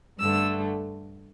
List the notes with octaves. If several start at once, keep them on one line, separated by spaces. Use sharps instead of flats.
G2 D3 A3 E6